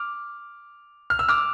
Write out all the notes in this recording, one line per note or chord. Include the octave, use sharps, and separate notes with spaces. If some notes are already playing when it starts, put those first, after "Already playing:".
Already playing: D6 F6
F6
E6
D6 F6